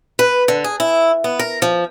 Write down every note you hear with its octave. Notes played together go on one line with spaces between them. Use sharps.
B4
D3
G#4
E4
B3
A#4
F3